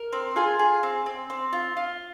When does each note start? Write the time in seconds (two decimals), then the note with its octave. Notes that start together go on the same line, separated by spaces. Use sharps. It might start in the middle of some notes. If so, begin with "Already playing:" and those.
Already playing: A#4
0.13 C4
0.36 F4 G#4 G#5
0.59 G#4
0.83 C4
1.06 C4
1.30 C4
1.53 F4
1.77 F4